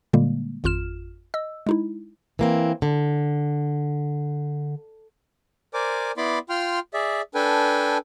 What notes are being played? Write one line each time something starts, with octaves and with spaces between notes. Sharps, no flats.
A#2 D3 G3 G#3 A#3
G#1 F2 F4 F6 E7
D#5 E6
G#3 D#4 E4
E3 A#3 C4
D3
A#4 C5 D5 G#5 D6
B3 E4 D5 B5 C6 D6
F4 G5 C6 F6
G#4 D5 E5
D4 A4 B4 G5 G#5